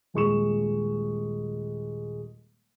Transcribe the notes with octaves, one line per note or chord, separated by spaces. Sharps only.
D#1 G#3 C#6 E7